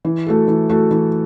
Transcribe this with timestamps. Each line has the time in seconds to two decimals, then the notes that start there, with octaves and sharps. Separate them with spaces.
0.05 E3
0.26 A3 F#4 A4
0.48 E3
0.69 A3 F#4 A4
0.91 E3